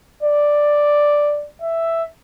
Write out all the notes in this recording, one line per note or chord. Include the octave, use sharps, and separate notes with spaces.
D5
E5